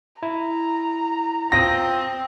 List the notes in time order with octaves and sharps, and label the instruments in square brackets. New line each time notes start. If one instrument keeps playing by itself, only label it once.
[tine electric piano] E4 [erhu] A#5
[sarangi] C4 [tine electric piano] F4 G5 D#6 [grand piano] A#6